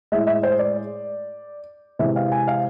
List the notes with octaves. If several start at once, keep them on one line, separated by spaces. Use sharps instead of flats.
A2 G#3 E5
E5
C5
D5
C3 E3 G#3 E5
F5
G#5
F5